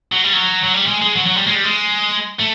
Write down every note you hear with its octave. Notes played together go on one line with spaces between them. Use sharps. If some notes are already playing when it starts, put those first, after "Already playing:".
F#3
G3
F#3
F#3
G3
G#3
G#3
F#3
F#3
G3
G#3
G3
G#3
A3